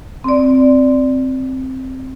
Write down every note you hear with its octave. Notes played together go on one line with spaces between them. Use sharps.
C4 D5